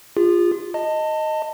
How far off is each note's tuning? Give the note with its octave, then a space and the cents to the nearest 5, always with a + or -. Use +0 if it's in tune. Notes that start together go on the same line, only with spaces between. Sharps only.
F4 +0 G#4 -40
D#5 +0 A5 +25